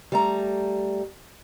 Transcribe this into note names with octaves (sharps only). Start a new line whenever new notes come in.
G3 A3 A#5